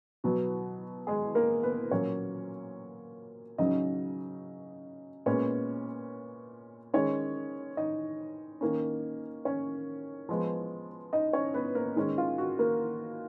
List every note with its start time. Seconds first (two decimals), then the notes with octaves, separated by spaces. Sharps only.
0.24 B2 F#3 B3 F#4
1.07 G#3 G#4
1.35 A#3 A#4
1.63 B3 B4
1.91 A#2 F#3 A#3 C#4 C#5
3.58 C#3 F#3 C#4 D#4 D#5
5.26 A#2 G#3 B3 C#4 C#5
6.94 D#3 G#3 C#4 C#5
7.77 D#4 D#5
8.61 D#3 A#3 C#4
9.45 C#4 C#5
10.29 F3 G#3 B3
11.13 D#4 D#5
11.33 C#4 C#5
11.54 B3 B4
11.75 A#3 A#4
11.96 D#3 G#3 C#4
12.18 F4
12.38 F#4
12.59 A#3 A#4